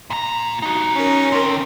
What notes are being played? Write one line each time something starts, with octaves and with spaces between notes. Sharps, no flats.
A#2 A#5
D#4 F#4
C#4 A#4
D#3 C4